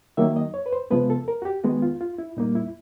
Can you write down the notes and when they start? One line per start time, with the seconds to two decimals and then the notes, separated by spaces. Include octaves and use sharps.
0.17 D#3 F#3 A#3 E5
0.36 D#5
0.54 C#5
0.66 B4
0.73 C5
0.91 C3 F3 G#3 B3 B4
1.10 A4
1.28 A#4
1.42 F#4
1.45 G4
1.64 D#3 G#3 B3 F#4
1.82 F4
2.01 F4
2.18 E4
2.37 A#2 G3 A#3 D#4
2.55 E4